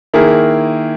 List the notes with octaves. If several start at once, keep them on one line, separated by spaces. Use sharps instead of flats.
D#3 A#3 E4 G#4